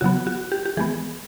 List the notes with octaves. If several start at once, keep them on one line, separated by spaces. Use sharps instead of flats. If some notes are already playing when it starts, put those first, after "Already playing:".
C#3 F#3 B3 F#4
F#4
G4
G4
E3 G#3 B3 G#4